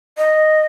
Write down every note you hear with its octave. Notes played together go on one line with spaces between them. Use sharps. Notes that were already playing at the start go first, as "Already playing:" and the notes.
D#5